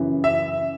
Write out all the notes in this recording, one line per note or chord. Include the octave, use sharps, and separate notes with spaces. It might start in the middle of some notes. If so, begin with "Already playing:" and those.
Already playing: F#2 C#3 E3
E5